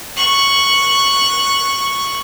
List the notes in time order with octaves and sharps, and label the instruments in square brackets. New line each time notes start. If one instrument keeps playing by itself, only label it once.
[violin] C#6 F#6